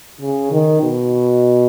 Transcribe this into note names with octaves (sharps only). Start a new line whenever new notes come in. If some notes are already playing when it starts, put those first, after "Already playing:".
C#3
D#3
B2